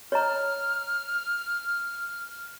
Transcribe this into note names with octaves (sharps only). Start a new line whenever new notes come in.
C#5 D#5 A#5 F6